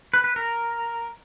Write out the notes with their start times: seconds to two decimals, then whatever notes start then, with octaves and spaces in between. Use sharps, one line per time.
0.14 B4
0.24 B4
0.36 A#4